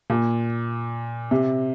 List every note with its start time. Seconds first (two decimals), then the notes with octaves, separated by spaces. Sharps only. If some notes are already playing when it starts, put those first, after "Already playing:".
0.10 A#2
1.31 C3